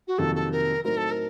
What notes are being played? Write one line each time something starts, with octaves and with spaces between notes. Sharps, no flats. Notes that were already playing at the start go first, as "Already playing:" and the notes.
F#4
F2 C3 D#3 F#3 A#3 A4
A4
A#4
A2 F#3 C4 D#4 A#4
A4
A#4